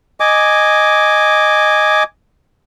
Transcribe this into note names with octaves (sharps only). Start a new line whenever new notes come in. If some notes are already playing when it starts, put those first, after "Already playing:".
D#5 G#5 D6